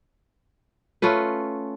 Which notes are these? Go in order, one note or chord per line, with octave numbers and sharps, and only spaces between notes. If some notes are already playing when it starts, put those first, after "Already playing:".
A3 C#4 F4 B4